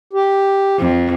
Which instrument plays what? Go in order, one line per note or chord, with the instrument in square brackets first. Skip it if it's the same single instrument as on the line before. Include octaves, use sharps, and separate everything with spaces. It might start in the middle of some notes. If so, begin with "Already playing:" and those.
[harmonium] G4
[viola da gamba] F2